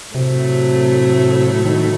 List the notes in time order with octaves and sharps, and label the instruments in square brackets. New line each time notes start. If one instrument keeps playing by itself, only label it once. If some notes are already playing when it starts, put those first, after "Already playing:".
[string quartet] A2 F#3 A3 [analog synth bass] C3
[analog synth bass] D#3